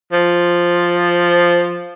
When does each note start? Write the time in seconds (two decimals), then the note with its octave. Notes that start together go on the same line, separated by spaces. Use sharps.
0.12 F3